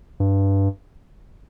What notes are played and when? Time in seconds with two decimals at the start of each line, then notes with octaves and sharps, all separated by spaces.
0.20 G2